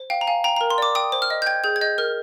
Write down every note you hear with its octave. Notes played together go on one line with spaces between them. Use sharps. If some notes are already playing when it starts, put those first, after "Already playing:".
Already playing: C5
F5 G5
A#5
F5 G#5
G5 A#5
A#5
A#4
C6
D5 D6
G5 D#6
C5
F6
D#5
G6
G5 G#6
G#4 G6
G#6
D#5 G6
A#4 F6